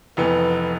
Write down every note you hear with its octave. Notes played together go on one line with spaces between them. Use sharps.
F1 F2 E3 B3 B4